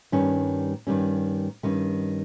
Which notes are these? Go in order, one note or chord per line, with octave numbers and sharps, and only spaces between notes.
G2 D#3 G3 C#4
G2 D#3 G3 C#4
G2 D#3 G3 C#4